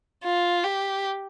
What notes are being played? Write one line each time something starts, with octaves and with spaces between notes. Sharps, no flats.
F4
G4